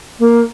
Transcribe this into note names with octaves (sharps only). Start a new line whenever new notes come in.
A#3